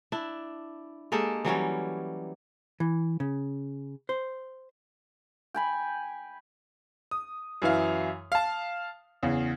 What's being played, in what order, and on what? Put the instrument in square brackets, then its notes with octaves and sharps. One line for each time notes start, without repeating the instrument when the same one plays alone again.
[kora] D4 E4
G#3 A#3 G4 A4
E3 F#3 G3 C#4
[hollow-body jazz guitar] E3
C#3
C5
[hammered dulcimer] G5 G#5 B5
[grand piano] D#6
F#2 E3 E4 F5
F5 A5
E2 C#3